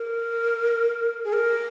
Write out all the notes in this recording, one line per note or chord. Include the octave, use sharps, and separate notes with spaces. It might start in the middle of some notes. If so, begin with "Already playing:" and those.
Already playing: A#4
G#4
A#4